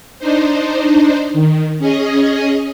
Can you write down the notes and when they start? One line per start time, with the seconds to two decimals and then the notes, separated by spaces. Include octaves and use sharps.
0.19 D4 D#4 C5
1.33 D#3
1.79 C#4 G#4 D#5